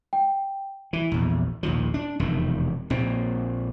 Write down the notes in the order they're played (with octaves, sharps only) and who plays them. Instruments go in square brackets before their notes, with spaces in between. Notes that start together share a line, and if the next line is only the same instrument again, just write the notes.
[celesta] G5
[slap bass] E3
A#1 E2
A#1 D#2 F3
D4
E1 F2 C3 D#3
A#1 A#2 C4